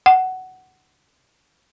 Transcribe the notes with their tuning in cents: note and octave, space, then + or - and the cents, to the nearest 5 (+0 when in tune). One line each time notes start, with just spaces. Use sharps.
F#5 +15